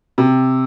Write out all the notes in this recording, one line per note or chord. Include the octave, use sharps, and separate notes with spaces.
C3